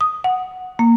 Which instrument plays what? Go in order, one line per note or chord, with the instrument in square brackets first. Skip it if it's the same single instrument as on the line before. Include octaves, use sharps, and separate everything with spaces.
[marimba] D#6
F#5
A#3